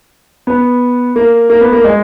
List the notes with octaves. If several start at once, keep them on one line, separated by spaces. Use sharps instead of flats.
B3
A#3
A#3
B3
A#3
G#3